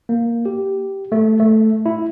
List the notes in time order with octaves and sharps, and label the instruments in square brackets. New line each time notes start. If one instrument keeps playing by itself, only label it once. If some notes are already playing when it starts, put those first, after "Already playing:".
[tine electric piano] A#3
G4
A3
A3
E4